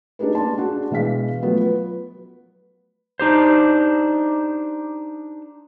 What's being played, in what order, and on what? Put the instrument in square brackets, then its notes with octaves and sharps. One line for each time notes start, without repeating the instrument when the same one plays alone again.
[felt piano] D4 D#4 G4 G#4 B4
A#3 A5 C6
D4 F#4 G#4
B2 E3 G#3 F5 B6
F3 F#3 A3 B3 F4
B4
[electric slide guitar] D4 D#4 G4 C5